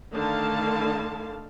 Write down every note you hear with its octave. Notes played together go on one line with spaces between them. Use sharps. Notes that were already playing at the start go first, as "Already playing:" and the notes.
D3 D#3 A3 F5 A5